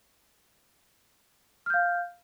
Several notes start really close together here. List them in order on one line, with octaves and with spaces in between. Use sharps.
F6 G6 F5